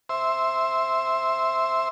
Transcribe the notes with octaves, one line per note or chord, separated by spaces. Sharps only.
C5 E5